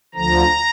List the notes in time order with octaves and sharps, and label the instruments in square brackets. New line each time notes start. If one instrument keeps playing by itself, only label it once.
[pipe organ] D2 D3 F3 A#5